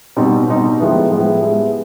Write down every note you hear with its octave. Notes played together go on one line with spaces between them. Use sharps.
B2 G3 C4 D#4
B2 G3 C4 D#4
A2 F3 G#3 B3 E4
A2 F3 G#3 B3 E4
G#3 B3 E4 G4